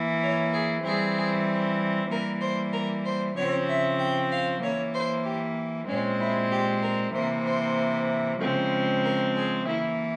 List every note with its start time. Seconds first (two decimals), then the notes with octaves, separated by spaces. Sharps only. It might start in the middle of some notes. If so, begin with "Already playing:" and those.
Already playing: E3 A#3
0.22 C#5
0.53 G#4
0.84 E3 G3 C4 G#4
2.10 E3 G3 A#3 A#4
2.41 C5
2.73 A#4
3.05 C5
3.36 C#3 F3 C4 C#5
3.68 E5
3.99 G5
4.31 F5
4.62 E3 A#3 C#5
4.94 C5
5.25 G4
5.88 A#2 G#3 C4 C#4
6.20 E4
6.51 G4
6.83 A#4
7.14 C3 E3 A#3 C5
7.46 C5
8.40 C#3 F3 G#3 C4
9.03 A#4
9.35 G#4
9.66 E3 A#3 E4